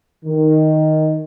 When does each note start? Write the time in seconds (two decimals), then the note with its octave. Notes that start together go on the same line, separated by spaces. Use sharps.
0.23 D#3